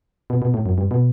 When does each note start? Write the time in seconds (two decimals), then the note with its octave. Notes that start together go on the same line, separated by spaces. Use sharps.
0.30 B2
0.42 B2
0.54 A2
0.66 F#2
0.78 G2
0.91 B2